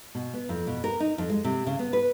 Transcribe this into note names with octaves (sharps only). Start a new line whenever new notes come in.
B2
B3
F2
B2
A#4
D#4
F2
G#3
C3
C#3
B3
B4